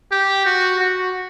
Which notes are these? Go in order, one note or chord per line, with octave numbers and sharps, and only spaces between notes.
G4
F#4
F#4